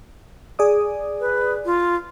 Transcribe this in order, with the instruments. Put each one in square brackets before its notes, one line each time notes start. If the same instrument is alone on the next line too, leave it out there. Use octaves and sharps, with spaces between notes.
[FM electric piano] G#4 D5 D#6
[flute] B4
F4